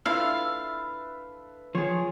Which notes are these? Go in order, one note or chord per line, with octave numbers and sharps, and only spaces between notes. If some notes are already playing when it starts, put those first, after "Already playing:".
D4 E4 F4 A4 B4 E5 F5
F3 G#4 C#5